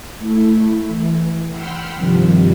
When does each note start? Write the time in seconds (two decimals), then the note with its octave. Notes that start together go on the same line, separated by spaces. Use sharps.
0.19 A3 E4
0.88 E3
1.51 F#5 G5 B5 C6 E6 F6
1.95 G2 C3 D#3 F3 G3